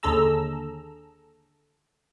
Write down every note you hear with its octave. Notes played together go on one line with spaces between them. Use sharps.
D#2 D3 G#4 A4 A#5 E6